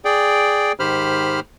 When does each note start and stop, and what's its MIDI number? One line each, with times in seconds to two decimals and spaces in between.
0.05 0.72 68
0.05 0.72 74
0.05 0.72 79
0.80 1.40 44
0.80 1.40 51
0.80 1.40 67
0.80 1.40 72
0.80 1.40 83
0.80 1.40 89